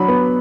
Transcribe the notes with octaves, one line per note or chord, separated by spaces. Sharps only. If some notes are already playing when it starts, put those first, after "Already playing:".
Already playing: F#3 D4 B5
B3